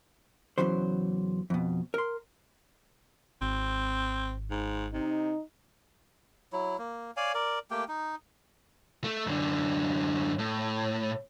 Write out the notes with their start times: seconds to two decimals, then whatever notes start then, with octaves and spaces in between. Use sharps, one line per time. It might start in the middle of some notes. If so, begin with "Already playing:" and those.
0.58 E2 A2 C#3 E3 F#3 C5
1.50 F2 B2
1.94 A#4 C6
3.42 G#1 C4
4.51 G#2
4.94 C3 D#4
6.53 F#3 E4
6.78 A#3
7.17 C#5 D5 F5 G#5
7.34 A#4 D5
7.71 A3 A#3 G4 G5
7.88 D#4
9.04 A3
9.27 F#2 D3
10.39 A2